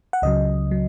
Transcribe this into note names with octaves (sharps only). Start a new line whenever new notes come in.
F#5
C#2 C#3 F#3 D#5
F#3